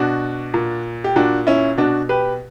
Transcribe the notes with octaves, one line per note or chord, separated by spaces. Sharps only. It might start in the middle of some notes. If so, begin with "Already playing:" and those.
Already playing: B2 D4 F#4
A#2
G4
A#2 D4 F#4
C#4 E4
B2 D4 F#4
G4 B4